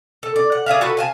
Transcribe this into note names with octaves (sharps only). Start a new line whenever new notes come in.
A4
D5
F#5
G#4 D5 E5 F5
F#4 A4 B4
F5 G#5 A5